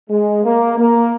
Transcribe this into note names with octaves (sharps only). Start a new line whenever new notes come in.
G#3
A#3
A#3